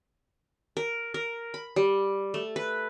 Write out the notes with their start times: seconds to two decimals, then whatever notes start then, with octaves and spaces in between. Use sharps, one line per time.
0.77 A#4
1.14 A#4
1.54 B5
1.76 G3
2.34 A3
2.56 B4